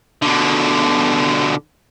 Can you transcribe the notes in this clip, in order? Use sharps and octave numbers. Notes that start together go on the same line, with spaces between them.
B2 D3